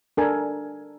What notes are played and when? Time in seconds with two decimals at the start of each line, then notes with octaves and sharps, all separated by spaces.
0.17 D4 A4 A#4 G#5